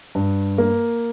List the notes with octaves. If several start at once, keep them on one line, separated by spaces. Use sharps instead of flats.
G2
A#3